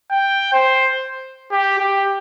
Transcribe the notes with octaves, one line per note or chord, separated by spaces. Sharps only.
G5
C5
G4
G4